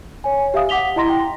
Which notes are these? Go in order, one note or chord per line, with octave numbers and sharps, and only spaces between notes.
C#5 G#5
G4 E5 F5 D#6
F#5 D6 B6 F7 G7
E4 D#5 A#5 C6 A#6
G5